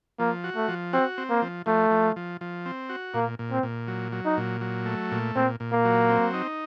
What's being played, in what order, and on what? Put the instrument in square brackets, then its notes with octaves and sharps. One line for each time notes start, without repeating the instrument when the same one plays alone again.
[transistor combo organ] F3 [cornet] A#3
[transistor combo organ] F#4
[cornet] A3
[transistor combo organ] F3
[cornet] C4 [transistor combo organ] F#4
[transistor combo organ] C4
[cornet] A#3
[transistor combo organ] F3
[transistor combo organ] F3 [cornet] A3
[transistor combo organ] F3
F3
F3
C4
F#4
[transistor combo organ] A#2 [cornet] A#3
[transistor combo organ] A#2
[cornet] C4
[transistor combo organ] A#2
F#3
F#3
[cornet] D#4
[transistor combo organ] A#2
F#3
A3
A#2
[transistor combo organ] A#2 [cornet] C4
[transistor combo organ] A#2
[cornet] A#3
[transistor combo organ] F#3
C4
D#4